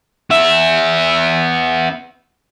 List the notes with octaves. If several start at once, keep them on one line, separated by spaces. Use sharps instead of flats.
B3 E5